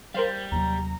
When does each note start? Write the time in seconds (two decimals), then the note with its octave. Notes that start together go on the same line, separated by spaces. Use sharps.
0.14 G3 A#4 C5 F5
0.52 D#2 C3 F#3 A#5